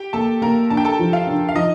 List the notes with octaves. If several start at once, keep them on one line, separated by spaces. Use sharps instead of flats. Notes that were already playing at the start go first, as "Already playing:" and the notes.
Already playing: G4 G5
A#3 A4 A5
A#3 A#4 A#5
D4 A5
G5
A4 A5
F3
F4 F5
D4
F5
F3 D#4 D#5